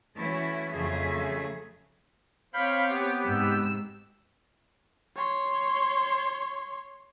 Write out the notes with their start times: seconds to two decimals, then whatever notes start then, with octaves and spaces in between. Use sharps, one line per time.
0.18 E3 A3 C#4 E4 F#4
0.73 F2 C#3 F#3 A3 G#4 E5
2.54 C4 C#5 F5 B5 D6 G6
2.89 B3 G4
3.25 G#2 C3 E6
5.16 C#5 C6